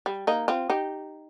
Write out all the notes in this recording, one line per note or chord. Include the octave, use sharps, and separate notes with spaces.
G3
A#3 D#4
C4 F4
D#4 G4